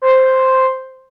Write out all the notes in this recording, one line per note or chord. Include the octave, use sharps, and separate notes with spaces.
C5